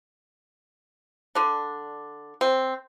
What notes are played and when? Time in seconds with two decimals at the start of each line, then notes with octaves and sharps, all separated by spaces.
1.35 D3 D4
2.41 C4